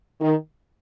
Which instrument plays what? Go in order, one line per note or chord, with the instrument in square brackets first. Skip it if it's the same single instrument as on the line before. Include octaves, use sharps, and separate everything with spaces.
[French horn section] D#3